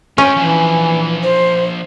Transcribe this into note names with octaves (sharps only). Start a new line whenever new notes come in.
C#4 F4 G5
E3 F3 D4 G#5
C5